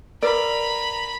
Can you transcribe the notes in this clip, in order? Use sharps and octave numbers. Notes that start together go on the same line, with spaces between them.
A#4 B4 D5 A#5 B5